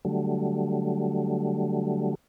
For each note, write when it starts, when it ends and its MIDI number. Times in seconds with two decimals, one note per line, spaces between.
0.05 2.15 50
0.05 2.15 54
0.05 2.15 55
0.05 2.15 57